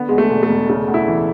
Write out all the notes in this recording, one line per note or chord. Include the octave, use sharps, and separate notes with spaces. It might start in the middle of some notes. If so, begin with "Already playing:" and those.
Already playing: D3 B3
E2 G#3
A3
E1
A3
E1
C#3 A3
D2
E4
E3